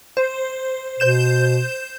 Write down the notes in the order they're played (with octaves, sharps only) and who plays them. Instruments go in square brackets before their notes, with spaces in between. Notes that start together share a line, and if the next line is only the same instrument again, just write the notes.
[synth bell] C5
[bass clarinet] B2 [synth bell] C5 G6 E7